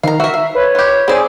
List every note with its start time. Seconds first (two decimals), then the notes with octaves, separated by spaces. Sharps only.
0.03 D#3 F5 A#5
0.20 F#4 A#4 E5
0.34 F5
0.55 B4 C#5
0.75 F4 G4
1.08 C4 G#4 D5